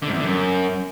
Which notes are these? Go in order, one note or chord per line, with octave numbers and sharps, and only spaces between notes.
D3
G#2
E2
D3
F#2